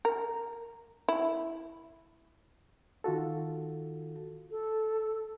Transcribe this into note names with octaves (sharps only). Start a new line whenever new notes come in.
A#4
E4
D#3 F4 F#4 A4
A4